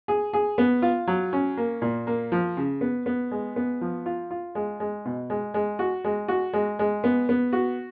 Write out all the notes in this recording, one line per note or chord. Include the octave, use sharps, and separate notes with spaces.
G#4
G#4
B3
F4
F#3
C#4
A#3
A#2
A#3
F3
C#3
B3
B3
G#3
B3
F3
F4
F4
G#3
G#3
B2
G#3
G#3
F#4
G#3
F#4
G#3
G#3
B3
B3
F#4